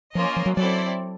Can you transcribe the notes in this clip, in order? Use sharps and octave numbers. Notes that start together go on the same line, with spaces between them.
F3 A#3 C#4 F4 A#4 D#5
F3
F#3
F#3 C4 E4 A4 D5